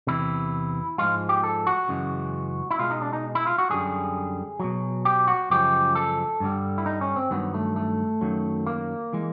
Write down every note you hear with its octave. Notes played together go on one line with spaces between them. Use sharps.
E2 C3 E3 E4
G#2 F3 G#3 F4
G4
A4
F#4
F#2 C#3 E3 G#3
E4
B2 G#3 F4
D#4
D4
D#4
E4
F4
F#4
F#2 D3 G3 G#4
B2 F#3
G4
F#4
F#2 C#3 F3 G#3 G4
A4
G2 D3 G3
E4
D#4
C#4
C4
G2 D#3 F#3 B3
A3
A3
F#2 D#3 F#3
A#3
E3 G#3